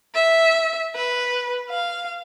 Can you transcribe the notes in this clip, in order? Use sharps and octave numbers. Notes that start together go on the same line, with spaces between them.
E5
B4
F5